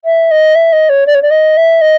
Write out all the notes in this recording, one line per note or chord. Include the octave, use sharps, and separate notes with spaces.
E5
D#5
E5
D#5
C#5
D5
C#5
D5
D#5
E5
D#5